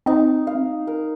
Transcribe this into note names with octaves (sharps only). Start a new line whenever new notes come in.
C4 D#4
F5
A#4